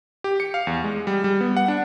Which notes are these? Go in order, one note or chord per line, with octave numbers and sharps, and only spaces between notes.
G4
C#7
F5
E2
G#3
G3
G3
B3
F#5
D4